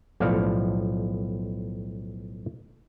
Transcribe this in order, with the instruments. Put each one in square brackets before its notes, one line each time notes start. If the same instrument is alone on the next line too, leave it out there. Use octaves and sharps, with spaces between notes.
[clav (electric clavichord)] B1 A2 F3 A4 D5 F5